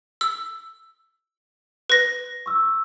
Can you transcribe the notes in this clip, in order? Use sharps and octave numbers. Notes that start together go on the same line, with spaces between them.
E6
B4 A#6
C#6 E6